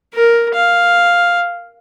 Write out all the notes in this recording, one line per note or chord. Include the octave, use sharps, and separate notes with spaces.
A#4
F5